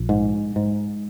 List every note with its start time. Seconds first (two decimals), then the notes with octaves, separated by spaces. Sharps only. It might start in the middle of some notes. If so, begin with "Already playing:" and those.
Already playing: A#1
0.09 G#2
0.56 G#2